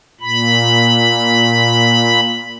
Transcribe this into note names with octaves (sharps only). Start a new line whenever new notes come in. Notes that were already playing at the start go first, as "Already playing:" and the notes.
A#2 B5